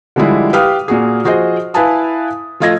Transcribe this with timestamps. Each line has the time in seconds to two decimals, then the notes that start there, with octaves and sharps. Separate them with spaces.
0.16 D3 F3 G3 G#3 E4
0.53 G4 B4 F5 D#6 F6
0.88 A#2 F#4 G#4
1.24 F3 F#4 G#4 C5 D#5
1.74 E4 B4 F5 G#5 A5 D#6
2.60 F3 A3 F4 D#5 G#6 A#6